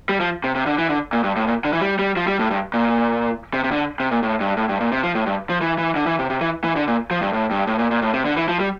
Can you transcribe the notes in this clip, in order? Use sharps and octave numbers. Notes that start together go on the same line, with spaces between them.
G3
F3
C3
C3
D3
E3
D3
A#2
G2
A2
A#2
D3
E3
G3
G3
F3
G3
A2
G2
A#2
C3
C3
D3
C3
A#2
A2
G2
A2
G2
A#2
C3
F3
A2
G2
F3
E3
E3
D3
E3
C3
C3
E3
E3
D3
A#2
F3
G2
A2
G2
A2
A#2
A#2
A2
C3
D3
E3
F3
G3